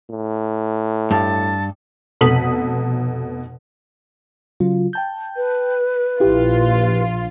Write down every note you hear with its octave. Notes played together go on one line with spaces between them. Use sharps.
A2
G2 A5
F1 B2 A4 D#6 B6 F#7
C#3 F#3 F4
G5 A5 G6
B4
A#1 E4 F4 G4